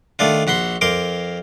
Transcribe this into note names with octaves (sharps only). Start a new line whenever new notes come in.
D#3 A3 D4 F4
A#1 F#4 B5 C6
F2 A#4 C6 D6